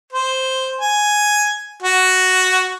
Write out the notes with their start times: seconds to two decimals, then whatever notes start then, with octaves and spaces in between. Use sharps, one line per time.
0.13 C5
0.81 G#5
1.82 F#4